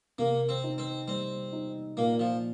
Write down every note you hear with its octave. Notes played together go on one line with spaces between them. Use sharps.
C3 A#3
C4
D#4
C4
G3 C4
D#4
A#2 A#3
F3